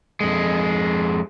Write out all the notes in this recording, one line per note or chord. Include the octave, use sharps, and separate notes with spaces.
F2 G#3